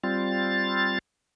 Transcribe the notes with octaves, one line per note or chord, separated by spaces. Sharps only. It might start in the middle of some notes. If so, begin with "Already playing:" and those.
G3 C4 F4 A6